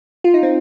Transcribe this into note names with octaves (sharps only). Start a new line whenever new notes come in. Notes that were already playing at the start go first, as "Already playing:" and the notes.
F4
D#4
C4